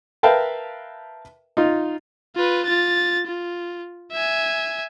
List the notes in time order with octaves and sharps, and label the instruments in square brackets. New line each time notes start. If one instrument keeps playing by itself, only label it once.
[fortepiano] A#4 B4 E5 F5 G5 A5
D#4 F4
[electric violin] F4 B4
F4 A6
F4
E5 G#5